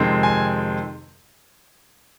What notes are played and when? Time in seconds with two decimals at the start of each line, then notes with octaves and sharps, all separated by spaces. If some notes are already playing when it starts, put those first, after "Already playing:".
Already playing: F2 C3 D#3 G#3 C4
0.23 G#5